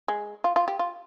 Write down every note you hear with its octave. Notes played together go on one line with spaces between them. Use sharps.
G#3
F4
F4
G4
F4